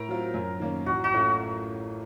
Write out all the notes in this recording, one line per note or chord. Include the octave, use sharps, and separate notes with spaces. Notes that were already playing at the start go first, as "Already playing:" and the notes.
Already playing: A2 A#4
F#3 C4 F4
F#2
D#3 A#3 C#4
A1 F#4
F#4
A2 A3 C#4 F4